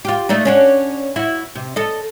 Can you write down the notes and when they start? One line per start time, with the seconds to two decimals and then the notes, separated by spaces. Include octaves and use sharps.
0.05 F4 G4
0.29 A3 D4 D#4
0.45 C#4 D4 F#4
1.16 E4 F#4
1.55 C3
1.76 A4 D#5